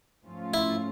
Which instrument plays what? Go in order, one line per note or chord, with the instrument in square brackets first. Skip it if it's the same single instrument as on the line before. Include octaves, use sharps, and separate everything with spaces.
[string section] G#2 F3 A3 C#4 F4
[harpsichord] E4